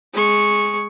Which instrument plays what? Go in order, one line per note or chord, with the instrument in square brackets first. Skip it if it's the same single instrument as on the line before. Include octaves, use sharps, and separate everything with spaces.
[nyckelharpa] G#3 C#6